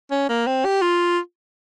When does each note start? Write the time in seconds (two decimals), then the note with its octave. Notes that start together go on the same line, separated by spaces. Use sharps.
0.11 C#4
0.29 A#3
0.47 C4
0.65 G4
0.82 F4